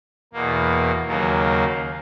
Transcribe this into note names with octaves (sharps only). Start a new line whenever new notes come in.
E2 B2 A#3
D#2 C#3 F#3 A#3